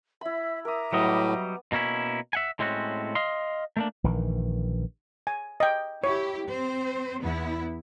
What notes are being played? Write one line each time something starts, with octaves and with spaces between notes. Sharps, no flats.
E4 E5 B5
A#4 E5 A#5 D6 D#6
A2 F#3 G3 B3 D#5
B2 A#3 C#4 E4
E5 F#5 G#5
A2 G#3 C4 C#4 F#4
D#5 F5 C6
A3 A#3 D4
A#1 D#3 E3
G#5
D#5 G5
E4 G4 C#5
C4 C5
E2 B3 E4